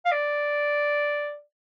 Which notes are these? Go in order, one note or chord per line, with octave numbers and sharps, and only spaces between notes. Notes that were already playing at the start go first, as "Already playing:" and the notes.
F5
D5